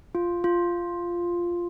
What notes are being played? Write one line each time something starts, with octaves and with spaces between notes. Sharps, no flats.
F4
F4